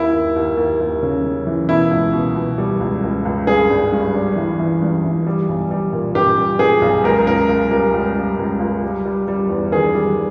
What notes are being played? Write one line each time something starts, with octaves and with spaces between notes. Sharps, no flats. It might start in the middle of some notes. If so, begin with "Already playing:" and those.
Already playing: D#2 E4
D#2
D#2
D#2
D#2
C#3
C#3
E3
B2 E4
C#2
B2
B2
G3
C#2
C#2
C#2
G2 G#4
G#1
G2
G3
E3
E3
G2
E3
G3
B1
G3
A#2
A#2 G4
G3
A#2 G#4
B1
C#2 A#4
C#2 A#4
C#2
G3 A#4
C#2
G3
C#2
C#2
G3
G3
G3
E2
D#3 G#4
G3